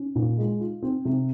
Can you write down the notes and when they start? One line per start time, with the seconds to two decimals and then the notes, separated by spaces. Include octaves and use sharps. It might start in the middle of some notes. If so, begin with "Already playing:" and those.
Already playing: C#4
0.15 A#2
0.38 G#3
0.60 F4
0.82 C4
1.05 C3